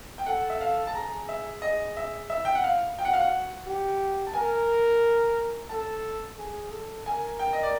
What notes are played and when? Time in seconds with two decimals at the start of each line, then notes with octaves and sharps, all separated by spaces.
0.18 G5
0.26 A4 F#5
0.50 E5
0.61 F5
0.87 A5
0.95 G#4 A#5
1.29 E5
1.62 G#4 D#5
1.97 E5
2.30 E4 E5
2.45 G5
2.55 F#5
2.64 F5
2.98 F#4 G5
3.05 F#5
3.13 F5
3.21 F#5
3.66 G4
4.27 A5
4.34 A#4 G#5
5.69 A4 A5
6.38 G#4
6.71 A4
7.06 A#4 G#5
7.39 G5
7.53 D#5
7.63 D5